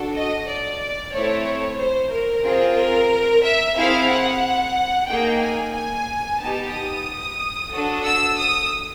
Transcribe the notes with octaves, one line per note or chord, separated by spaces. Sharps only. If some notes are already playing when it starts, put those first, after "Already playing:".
Already playing: D4 F#4 A4
D#5
D5
A3 C4 E4 A4 C#5
C5
A#4
C4 F4 G#4
A#4
E5
C4 E4 G#4 F5
F#5
A#3 D#4 G#4 G5
G#5
G#5
B3 D#4 G4 A5
D#6
D4 F#4 A4
E6
D#6